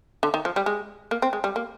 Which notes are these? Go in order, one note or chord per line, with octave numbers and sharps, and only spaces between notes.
D3
D#3
F3
G3
G#3
A#3
C4
G#3
G3
A#3